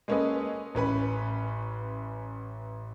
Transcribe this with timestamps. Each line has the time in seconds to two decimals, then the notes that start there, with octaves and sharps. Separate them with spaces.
0.08 G#3 A#3 C#4 A4 B4 D#5
0.75 A1 C#4 B4 B5